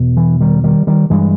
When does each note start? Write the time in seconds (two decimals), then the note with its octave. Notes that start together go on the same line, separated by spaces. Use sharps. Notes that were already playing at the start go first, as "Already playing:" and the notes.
Already playing: E2 B2
0.17 E3
0.41 D#3 G3
0.64 D#3 G3
0.87 D#3 G3
1.10 G2 E3 G#3